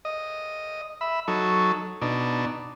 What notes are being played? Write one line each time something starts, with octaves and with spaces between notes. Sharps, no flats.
D#5
E5 B5
F#3 D#4 A4 C#6
B2 D4 D#4